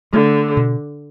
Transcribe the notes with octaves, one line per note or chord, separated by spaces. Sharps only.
D3 A3
B2